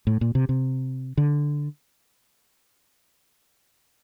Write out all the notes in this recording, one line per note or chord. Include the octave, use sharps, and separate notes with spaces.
A2
A#2
C3
C3
D3